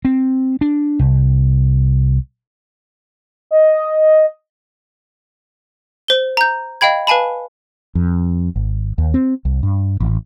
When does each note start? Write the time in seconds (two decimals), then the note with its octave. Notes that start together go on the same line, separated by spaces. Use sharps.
0.05 C4
0.61 D4
0.99 C2
3.51 D#5
6.08 C5 G7
6.37 A#5 G6
6.81 D#5 F5 G5 B5 G#6
7.07 B4 F5 G#5 A5 B5
7.95 F2
8.56 G#1
8.98 D#2
9.14 C4
9.45 C2
9.63 G2
10.00 A1